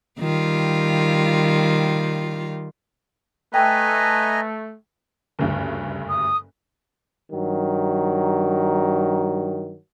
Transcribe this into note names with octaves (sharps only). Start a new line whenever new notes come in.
D#3 G3 F4
A3 B4 D#5 G5 G#5 A#5
F#1 D2 G2
D#6
G2 D#3 F#3